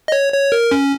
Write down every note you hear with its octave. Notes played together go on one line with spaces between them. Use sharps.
D#5
C#5
C#5
A#4
C#4